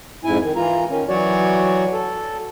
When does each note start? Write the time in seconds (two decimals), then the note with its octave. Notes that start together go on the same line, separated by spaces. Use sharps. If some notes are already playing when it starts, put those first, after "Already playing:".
0.24 F2 G#2 E4 G#5
0.43 D#3
0.56 E3 F4 A#5
0.90 D#3 C#4
1.09 E3 F#3 F#4 C#5 D5
1.93 A4